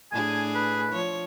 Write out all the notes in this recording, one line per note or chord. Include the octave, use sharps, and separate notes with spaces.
A2 D4 G#4 G#5
B4
F3 C#5